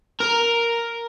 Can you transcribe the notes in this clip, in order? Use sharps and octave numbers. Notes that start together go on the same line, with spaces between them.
A#4